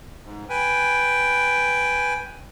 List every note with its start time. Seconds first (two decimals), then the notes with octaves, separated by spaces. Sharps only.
0.23 G#2
0.49 B4 G5 G#5